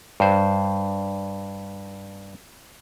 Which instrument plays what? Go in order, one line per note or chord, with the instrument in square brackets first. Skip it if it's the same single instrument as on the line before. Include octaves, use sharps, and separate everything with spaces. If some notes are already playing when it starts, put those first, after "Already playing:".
[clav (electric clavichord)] G2 C5